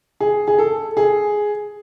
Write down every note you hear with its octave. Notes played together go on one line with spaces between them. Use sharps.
G#4
G#4
A4
G#4